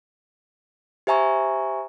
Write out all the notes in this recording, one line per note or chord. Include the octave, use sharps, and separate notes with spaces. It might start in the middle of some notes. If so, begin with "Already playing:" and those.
G4 C5 E5 G#5 A#5 C#6